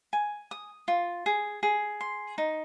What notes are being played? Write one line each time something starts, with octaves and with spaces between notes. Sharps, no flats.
G#5
D#6
F4
G#4
G#4
C6
D#4